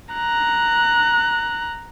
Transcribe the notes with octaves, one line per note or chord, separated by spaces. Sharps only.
A#5 F#6